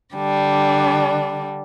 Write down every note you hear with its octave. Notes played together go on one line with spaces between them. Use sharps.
D3 G3 D4